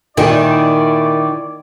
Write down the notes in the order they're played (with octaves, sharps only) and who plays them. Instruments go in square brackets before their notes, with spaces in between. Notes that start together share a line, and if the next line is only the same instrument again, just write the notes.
[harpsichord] A#2 [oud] D#3 [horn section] E4 C#5 D5